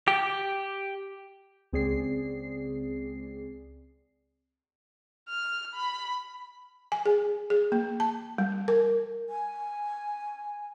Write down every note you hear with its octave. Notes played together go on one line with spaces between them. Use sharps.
G4
C#2 C4 G#4 D5 C7
F6
B5
G#5
G#4
G#4
A#3
A5
G3
A#4
G#5